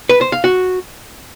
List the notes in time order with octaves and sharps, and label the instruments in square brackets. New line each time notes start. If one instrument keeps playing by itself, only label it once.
[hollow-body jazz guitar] B4
C5
F5
F#4